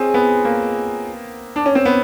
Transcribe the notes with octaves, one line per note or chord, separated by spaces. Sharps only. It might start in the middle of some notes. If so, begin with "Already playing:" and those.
Already playing: G#3 C4 C#4 F4 G#4
B3
A#3
D4
C#4
C4
B3